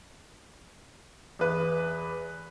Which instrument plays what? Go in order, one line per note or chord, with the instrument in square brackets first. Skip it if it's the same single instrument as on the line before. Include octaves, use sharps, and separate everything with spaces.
[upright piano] E2 B4